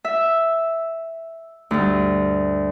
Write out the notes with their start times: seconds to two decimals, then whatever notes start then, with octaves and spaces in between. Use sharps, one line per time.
0.04 E5
1.71 D2 G2